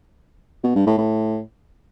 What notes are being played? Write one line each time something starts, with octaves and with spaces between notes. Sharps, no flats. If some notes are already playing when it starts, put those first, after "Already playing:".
B2
G2
A2
A2